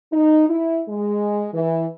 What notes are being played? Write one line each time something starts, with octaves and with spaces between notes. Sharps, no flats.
D#4
E4
G#3
E3